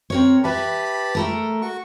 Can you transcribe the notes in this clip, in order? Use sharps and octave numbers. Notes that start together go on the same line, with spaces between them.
C4 A#4 C#5
G4 B4 E5 A5 B5
A3 A4 A#4
F#4 C#6